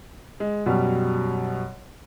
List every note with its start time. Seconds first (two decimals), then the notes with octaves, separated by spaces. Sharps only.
0.40 G#3
0.66 F#2 B2 G3